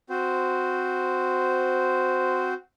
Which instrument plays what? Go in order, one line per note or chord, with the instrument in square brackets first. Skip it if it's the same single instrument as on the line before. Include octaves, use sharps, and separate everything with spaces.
[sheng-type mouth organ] C4 F#4 C5